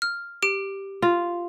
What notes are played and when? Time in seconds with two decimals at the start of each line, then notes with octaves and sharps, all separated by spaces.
0.02 F6
0.43 G4 D7
1.02 F4